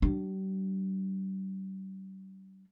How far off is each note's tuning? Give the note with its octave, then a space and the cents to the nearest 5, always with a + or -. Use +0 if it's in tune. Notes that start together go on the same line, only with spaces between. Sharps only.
G3 -40 D4 +0